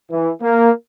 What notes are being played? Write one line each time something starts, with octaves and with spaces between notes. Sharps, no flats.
E3
A#3